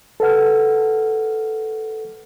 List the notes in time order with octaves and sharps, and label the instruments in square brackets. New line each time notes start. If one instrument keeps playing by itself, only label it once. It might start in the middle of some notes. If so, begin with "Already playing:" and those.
[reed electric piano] A4 B4 F#5 F6